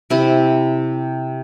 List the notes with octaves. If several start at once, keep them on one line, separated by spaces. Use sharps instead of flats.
C3 E4